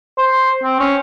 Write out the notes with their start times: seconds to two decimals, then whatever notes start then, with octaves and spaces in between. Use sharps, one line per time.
0.18 C5
0.63 C4
0.80 C#4